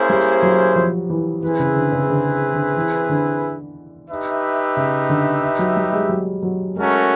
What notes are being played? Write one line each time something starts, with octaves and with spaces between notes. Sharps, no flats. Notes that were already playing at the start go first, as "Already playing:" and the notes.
Already playing: A#3 C#4 E4 G#4 C5
G3
F#3
F3
E3
E3 C4 E4 G#4 B4
C#3
D3
C#3
D3
D3
E3
D3
D#4 G4 B4 E5
C#3
D3
F#3
G3
G#3
F#3
F#3
G#3 A3 C#4 F#4 A#4